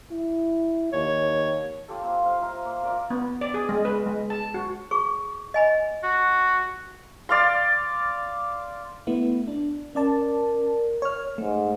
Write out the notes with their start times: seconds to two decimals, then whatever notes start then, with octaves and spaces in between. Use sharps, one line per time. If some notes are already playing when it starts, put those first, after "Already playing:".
0.11 E4
0.93 D#2 C#5
1.88 F4 G4 A4
2.02 A#3 C4
2.24 C5 F5
2.41 F4 E5 A#5
2.65 A#3 F5 D6
2.83 F4 A#4 D5 E5
3.10 B3
3.41 D5
3.54 G#4
3.69 G#3
3.85 B4
4.06 G#3
4.30 A5
4.54 F#4
4.91 G#4 C#6
5.54 D#5 G#5 B5
6.03 F#4
7.29 D5 F5 C6
9.07 A3 B3 E4
9.48 D4
9.95 C#4 A#4 D5 A5
11.02 C#5 F6
11.38 G#2 A3